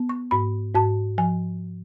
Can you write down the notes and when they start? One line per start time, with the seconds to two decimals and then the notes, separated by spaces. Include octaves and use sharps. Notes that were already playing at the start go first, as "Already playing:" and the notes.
Already playing: B3
0.09 C#6
0.31 G#2 B5
0.74 G#2 A5
1.18 F3 G#5